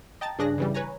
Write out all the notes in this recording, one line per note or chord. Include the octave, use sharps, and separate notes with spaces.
D#5 G5 A5 A#5 A6
G2 C#3 D4 G#4 F#6 A#6
C#3 E3 G3
B4 C#5 G#5 A#5